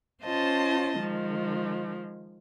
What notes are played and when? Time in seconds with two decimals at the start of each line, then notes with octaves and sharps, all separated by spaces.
0.23 C#4 F4 C5 D#5 A5
1.00 D#3 F3 G#3